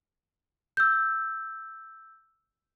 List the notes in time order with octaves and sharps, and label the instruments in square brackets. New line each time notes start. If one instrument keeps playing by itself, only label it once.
[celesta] E6 G6